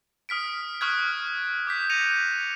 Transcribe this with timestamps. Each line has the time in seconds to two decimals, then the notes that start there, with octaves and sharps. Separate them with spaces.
0.29 D#6 F6 B6 D7
0.81 C#6 D#6 F6 F#6 G#6
1.67 D6 G6 B6
1.90 G6 A#6 C#7 D#7 F7